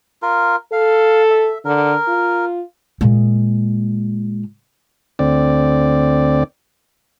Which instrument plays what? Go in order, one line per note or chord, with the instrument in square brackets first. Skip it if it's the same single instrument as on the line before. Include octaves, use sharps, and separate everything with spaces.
[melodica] F4 A#4
[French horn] A4 [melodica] F5
[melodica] E5
[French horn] D3 [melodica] A#4
[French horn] F4
[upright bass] A#2 G#3
[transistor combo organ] D2 C4 D5